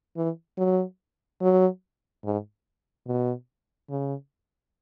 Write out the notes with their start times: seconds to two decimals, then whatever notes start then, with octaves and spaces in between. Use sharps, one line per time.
0.17 E3
0.58 F#3
1.41 F#3
2.24 G#2
3.07 B2
3.90 C#3